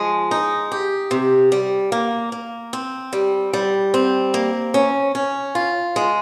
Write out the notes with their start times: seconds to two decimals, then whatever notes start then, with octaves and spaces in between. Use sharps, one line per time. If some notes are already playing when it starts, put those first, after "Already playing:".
Already playing: F3 G#3
0.31 D#4
0.72 G4
1.11 C3
1.52 G3
1.92 A#3
2.32 A#3
2.73 C4
3.13 G3
3.53 G3
3.94 C4
4.34 A#3
4.74 C#4
5.15 C#4
5.55 F4
5.96 G#3